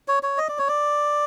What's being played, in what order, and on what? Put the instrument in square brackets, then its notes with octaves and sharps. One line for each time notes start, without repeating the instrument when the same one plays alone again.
[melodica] C#5
C#5
D#5
D5
C#5
D5